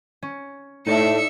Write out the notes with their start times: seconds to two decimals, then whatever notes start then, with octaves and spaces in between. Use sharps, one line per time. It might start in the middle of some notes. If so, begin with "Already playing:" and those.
0.22 C#4
0.87 A2 A3 D#4 D5 E5 C7 C#7